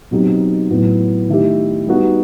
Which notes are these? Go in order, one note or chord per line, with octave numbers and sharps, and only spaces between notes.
B2 F#3 C4 D#4 G4
A2 F#3 B3
D#3 A3 E4 G4
G3 B3 D#4 F#4